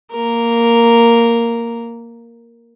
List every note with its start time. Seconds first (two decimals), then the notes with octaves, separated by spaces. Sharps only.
0.12 A#3 A#4